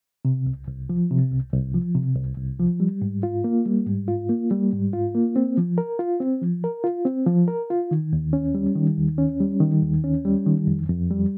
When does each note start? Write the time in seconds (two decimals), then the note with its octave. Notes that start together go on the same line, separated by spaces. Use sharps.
0.25 C3
0.46 C2
0.67 C2
0.89 F3
1.11 C3
1.31 C2
1.53 C2
1.74 F3
1.95 C3
2.16 C2
2.38 C2
2.59 F3
2.80 G3
3.02 G#2
3.23 F4
3.44 A#3
3.66 G3
3.87 G#2
4.08 F4
4.29 A#3
4.51 G3
4.72 G#2
4.93 F4
5.15 A#3
5.36 C4
5.58 F3
5.78 A#4
5.99 F4
6.20 C4
6.42 F3
6.64 A#4
6.84 F4
7.05 C4
7.27 F3
7.48 A#4
7.70 F4
7.91 D#3
8.13 D#2
8.33 C#4
8.55 G3
8.75 D#3
8.97 D#2
9.18 C#4
9.40 G3
9.60 D#3
9.83 D#2
10.04 C#4
10.25 G3
10.46 D#3
10.67 F2
10.89 F2
11.10 G3